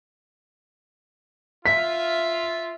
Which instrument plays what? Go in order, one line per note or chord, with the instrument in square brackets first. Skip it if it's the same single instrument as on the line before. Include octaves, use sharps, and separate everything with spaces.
[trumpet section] F4 [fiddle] E5 [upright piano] B6